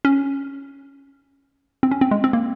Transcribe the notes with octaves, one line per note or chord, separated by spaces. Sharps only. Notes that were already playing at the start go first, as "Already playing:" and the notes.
C#4
C4
C#4
C4
G#3
C4
A#3